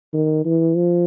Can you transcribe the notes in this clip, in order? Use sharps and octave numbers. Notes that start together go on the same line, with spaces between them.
D#3
E3
F3